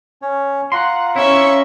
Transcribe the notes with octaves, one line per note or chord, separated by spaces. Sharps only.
C#4 C#5
F4 F#5 A#5 C6
C#4 E4 E5 C#6